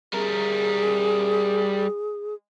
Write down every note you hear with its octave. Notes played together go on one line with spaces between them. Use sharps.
G3 G#4 A#4